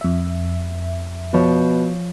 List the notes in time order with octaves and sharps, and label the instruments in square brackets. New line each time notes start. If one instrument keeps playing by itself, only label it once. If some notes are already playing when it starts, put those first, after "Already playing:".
[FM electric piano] F2 E5
[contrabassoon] B2 [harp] F3 C#5 G6